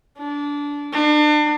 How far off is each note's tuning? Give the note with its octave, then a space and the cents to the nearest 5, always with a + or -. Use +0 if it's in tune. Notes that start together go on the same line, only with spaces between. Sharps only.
D4 -20
D4 +35